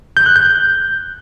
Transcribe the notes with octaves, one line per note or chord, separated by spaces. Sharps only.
G6
F#6
G6